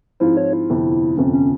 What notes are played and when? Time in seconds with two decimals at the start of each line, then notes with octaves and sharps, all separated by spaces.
0.20 G#2 F3 C4 E4 F4
0.37 C#5
0.53 E4
0.69 G1 F2 C3
1.17 G1 F2 C3 C#4
1.33 C#4